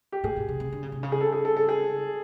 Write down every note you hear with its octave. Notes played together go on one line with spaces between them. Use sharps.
G4
A#2 G#4
B2
C3
C3
D3
C#3
C3
C#3
G#4
A4
G#4
A4
A4
G#4